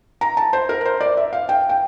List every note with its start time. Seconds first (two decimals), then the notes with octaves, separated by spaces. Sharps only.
0.21 A#5
0.37 A5
0.53 C5
0.69 A#4
0.85 C5
1.01 D5
1.17 E5
1.33 F5
1.49 G5
1.69 G5